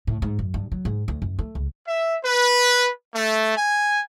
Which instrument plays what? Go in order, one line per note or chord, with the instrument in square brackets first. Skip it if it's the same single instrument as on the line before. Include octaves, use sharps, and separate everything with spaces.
[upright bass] A2
G#2
F#2
G2
F#3
G#2
D2
F#2
A3
C#2
[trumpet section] E5
B4
A3
G#5